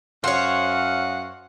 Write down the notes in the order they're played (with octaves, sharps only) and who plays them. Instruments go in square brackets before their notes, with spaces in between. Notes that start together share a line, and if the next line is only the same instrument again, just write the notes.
[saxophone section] F#2 F5 F#5 [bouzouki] C5 C#5